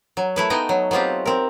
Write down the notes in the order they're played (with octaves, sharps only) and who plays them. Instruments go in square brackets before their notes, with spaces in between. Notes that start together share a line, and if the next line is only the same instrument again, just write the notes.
[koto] F#3
A3 E4 B4
A3 B3 D#4 F#4 D#5 G5
F#3
F#3 B3 C4 F4 G4
C4 A#4